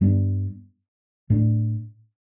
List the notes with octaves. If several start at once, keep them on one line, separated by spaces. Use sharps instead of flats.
G2 G3 B3 D4
A2 A3 D4